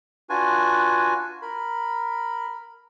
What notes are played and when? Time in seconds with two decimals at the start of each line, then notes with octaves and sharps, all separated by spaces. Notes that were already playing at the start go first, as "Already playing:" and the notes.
0.30 D4 F4 F#4 B4 G#5
1.42 A#4 B5